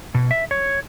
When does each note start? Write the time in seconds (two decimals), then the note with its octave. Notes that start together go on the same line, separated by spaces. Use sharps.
0.15 B2
0.31 E5
0.51 C#5